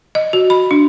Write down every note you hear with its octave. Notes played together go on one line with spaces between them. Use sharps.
D#5
F#4
B5
D4